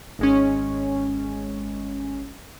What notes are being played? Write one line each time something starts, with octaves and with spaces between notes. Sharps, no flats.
G#1 G#3 C#4